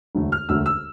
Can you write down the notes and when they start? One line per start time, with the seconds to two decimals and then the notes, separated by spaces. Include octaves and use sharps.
0.15 E1 D2 D3 A3
0.32 F6
0.49 E1 D2 D3 A3 E6
0.66 E6